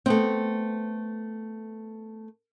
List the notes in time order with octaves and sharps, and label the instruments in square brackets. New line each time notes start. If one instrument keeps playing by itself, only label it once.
[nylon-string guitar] A3 B3 C4